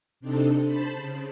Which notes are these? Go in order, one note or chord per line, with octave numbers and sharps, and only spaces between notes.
C3 C4 D4 D#4 A4
C5 A5 B5
C#3